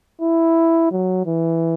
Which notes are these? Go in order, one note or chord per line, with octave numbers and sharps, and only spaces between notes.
E4
F#3
E3